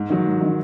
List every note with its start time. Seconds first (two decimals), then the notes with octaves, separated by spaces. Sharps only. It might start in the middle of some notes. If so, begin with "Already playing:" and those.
Already playing: G#2
0.10 D#3 F#3
0.25 G#2
0.41 D#3 F#3